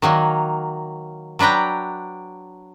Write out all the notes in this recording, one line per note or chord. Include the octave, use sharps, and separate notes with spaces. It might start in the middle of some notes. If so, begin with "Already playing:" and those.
D#3 F#3 A#3
F#3 D4 B4 G5 A#5